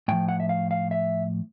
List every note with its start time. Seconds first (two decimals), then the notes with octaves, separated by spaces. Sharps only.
0.08 A2 F3 G5
0.29 F#5
0.40 E5
0.49 F5
0.71 F5
0.91 E5